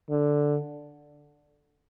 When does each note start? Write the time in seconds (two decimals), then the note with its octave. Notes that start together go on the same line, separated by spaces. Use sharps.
0.10 D3